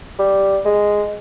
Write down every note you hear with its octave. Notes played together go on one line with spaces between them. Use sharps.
G3
G#3